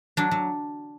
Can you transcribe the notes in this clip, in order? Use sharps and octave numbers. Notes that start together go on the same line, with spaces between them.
F#3 D4
F#3